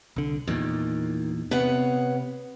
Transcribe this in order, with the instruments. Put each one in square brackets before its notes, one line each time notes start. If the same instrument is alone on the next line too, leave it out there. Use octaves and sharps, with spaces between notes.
[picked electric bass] C2 D3
[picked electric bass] E2 A#2 [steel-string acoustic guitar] D#3
[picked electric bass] C3 [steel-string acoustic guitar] B3 C#5 F#5